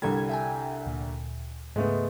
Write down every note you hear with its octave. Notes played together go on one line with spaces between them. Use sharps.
C2 D3 G3 A4 G#6
E5 G5 G#5
D2 A#2
G#2 C#3 G#3 A3 B3